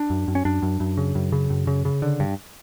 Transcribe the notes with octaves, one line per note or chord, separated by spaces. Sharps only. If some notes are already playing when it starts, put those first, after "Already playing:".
Already playing: D4
F#2
F#2
C#4
F#2 D4
F#2
F#2
C#3
F#2
C#3
F#2
C#3
C#3
D3
G2